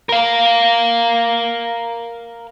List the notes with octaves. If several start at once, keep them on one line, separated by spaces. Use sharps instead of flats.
A#4 F5